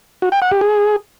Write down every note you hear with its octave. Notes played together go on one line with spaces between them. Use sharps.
F#4
G5
F#5
G4
G#4